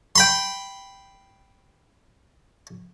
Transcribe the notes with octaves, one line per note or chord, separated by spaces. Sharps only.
G5 B5 C6